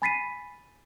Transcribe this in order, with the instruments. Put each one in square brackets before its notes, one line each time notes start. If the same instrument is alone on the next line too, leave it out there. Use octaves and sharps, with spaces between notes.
[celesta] G#5 B5 A6 B6 C7 D#7